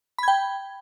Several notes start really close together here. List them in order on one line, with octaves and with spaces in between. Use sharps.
B5 G#6 G5